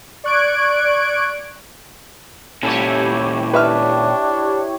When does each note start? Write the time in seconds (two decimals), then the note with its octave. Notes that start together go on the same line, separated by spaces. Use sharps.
0.24 D5 C#6 F#6 G#6 D7
2.63 A#2 C#4 E4 G4 A4 C#5
3.53 D4 B4 E5 F6